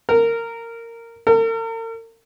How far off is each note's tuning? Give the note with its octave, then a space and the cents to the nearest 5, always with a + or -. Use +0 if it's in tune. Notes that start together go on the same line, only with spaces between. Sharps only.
A#4 -15
A#4 -45